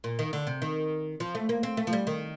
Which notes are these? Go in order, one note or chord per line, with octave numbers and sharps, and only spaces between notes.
A#2
D#3
D3
C3
D#3
F3
A3
A#3
C4
A3
F3
G3
D#3